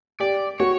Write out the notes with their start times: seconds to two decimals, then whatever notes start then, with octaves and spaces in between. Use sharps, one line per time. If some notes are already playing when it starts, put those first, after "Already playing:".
0.20 G4 D5
0.60 F#4 C#5